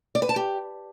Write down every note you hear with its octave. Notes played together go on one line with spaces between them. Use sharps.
D5
B4
A5
G4